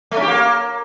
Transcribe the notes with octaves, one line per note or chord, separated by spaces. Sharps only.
A3
C#4
G4
A#3